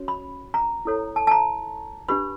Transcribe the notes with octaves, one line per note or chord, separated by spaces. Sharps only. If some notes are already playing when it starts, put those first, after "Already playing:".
Already playing: C#4 F#4 C#5
B5
A#5
E4 A4 C#5
A5
A5
A#5
D4 G4 B4 B5